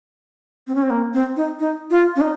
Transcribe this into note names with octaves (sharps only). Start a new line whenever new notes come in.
C4
C#4
C4
A#3
C4
D#4
D#4
F4
C#4
D#4